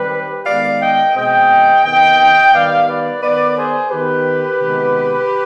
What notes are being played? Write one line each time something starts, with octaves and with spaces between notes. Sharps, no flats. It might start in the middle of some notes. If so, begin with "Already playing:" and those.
Already playing: D#3 G3 C4 G4 B4
D#3 G#3 B3 D5 F5
D#5 G5
B2 G#3 C4 D#5 G5
C3 D#3 B3 D#5 G5
D#3 G3 B3 D5 F5
B4 D5
D#3 B3 B4 D5
G#4 C5
D#3 B3 G4 B4
C3 D#3 G#3 B3